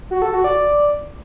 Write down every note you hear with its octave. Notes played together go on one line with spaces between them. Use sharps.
F#4
A4
F#4
D5